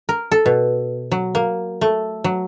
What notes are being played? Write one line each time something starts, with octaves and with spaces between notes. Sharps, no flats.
A#4
A4
B2
F#3
A#3
A3
F#3